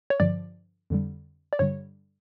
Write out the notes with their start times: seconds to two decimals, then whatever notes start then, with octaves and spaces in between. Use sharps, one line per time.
0.10 C#5
0.20 G2 D3 F3 D5
0.90 F2 D3 G3
1.53 D5
1.59 G2 D3 G3 C#5